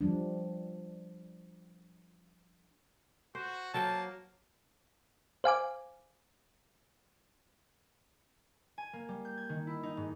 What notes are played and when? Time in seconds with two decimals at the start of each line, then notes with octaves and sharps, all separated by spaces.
0.01 F3 G3 D4
3.35 F#4 C5
3.74 F#3 A#3 G5 A5
5.44 C5 F5 G#5 D6
8.78 G#5
8.93 A#3
9.09 G3
9.25 G6
9.38 G#6
9.49 D#3
9.67 E4
9.83 D#4
9.97 G#2